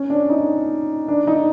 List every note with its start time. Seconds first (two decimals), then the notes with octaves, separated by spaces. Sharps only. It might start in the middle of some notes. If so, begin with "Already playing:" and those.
Already playing: C#4
0.10 D4
0.30 D#4
1.08 D4
1.27 D#4